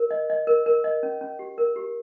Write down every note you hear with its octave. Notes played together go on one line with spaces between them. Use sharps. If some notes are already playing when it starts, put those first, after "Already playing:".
Already playing: A#4
D#5
D#5
A#4
A#4
D#5
C#4
C#4
G4
A#4
G4